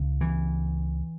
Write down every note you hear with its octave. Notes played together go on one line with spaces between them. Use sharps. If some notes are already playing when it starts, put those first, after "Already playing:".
Already playing: C#2 C#3
E3